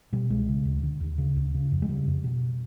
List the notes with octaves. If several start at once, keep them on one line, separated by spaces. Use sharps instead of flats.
B2 G3
C2 G#3
C#3
D2
D3
D#2
C#3
D2
C#3
F2
G#3
C#3 G3
F2
B2